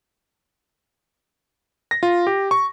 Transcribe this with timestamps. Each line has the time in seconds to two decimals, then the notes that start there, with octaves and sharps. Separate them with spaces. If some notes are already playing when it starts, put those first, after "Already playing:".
1.91 A#6
2.03 F4
2.27 G4
2.51 C#6